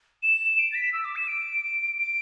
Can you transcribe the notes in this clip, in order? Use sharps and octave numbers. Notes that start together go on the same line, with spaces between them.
E7
D7
A6
B6
E6
D6
E7
D7
D7